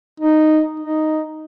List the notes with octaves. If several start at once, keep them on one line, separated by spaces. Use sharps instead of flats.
D#4
D#4